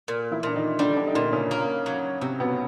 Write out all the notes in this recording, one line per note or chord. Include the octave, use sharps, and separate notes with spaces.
A#2
E3 E4
A#2 D4
D#3 D#4
D3 G3 D4
D3 D4
D#4
A#2 D3 D4
C#3 C#4
A#3
F#3
C3 F#3 C4
B2 B3